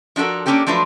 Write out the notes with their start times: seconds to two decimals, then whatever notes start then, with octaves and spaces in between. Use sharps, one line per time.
0.16 F3 D4 F#4 A4 A#4
0.46 A#3 B3 C#4 D4 G4 A4
0.67 F3 F#3 A3 D4 F4 B4